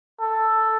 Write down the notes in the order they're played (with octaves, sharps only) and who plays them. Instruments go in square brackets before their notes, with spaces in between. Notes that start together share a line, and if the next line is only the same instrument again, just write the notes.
[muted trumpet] A4